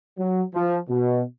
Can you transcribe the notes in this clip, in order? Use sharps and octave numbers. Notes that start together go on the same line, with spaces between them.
F#3
F3
B2